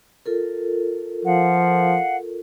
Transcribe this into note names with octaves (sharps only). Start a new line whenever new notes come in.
F4 A4 A#4
F3 F5 F#5